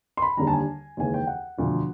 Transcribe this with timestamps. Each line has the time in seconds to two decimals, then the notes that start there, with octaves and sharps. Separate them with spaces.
0.17 C6
0.22 B5
0.37 D#2 D3 G3 A#5
0.47 A5
0.53 G#5
0.97 D#2 C#3 E3 G#3 G#5
1.14 G5
1.27 F#5
1.58 E1 D2 D3 F3